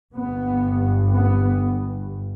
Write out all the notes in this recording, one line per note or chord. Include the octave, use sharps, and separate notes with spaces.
G1 G2 B3
B3